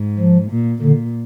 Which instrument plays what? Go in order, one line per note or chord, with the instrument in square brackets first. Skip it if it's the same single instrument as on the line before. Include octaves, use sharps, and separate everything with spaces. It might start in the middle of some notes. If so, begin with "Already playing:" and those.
Already playing: [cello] G#2
[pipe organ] F3
[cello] A#2
[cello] A#2 [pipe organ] D3